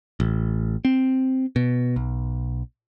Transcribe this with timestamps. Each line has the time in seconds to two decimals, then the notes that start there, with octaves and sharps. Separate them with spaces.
0.20 A1
0.85 C4
1.56 B2
1.96 B1